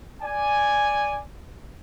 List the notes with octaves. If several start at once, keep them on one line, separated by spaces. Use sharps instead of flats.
D5 G#5